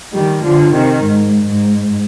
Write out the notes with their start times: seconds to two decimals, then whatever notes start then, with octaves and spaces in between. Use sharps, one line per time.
0.14 D#3 G3
0.43 D3 F3
0.73 C3 D#3
1.03 G#2
1.47 G#2